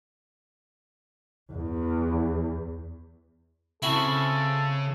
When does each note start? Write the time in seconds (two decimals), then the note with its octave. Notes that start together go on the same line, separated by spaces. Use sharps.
1.53 E2
3.83 C#3 C4 E4 F#4 A4